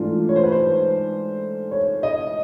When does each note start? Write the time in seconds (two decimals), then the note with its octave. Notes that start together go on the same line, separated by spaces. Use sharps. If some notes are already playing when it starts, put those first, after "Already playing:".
Already playing: G#2 E3 A3 D4 F4
0.29 C#5
0.36 C5
0.44 B4
0.52 C5
1.71 C#5
2.03 D#5